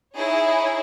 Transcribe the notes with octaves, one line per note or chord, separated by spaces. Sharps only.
D#4 E4 G#4 C#5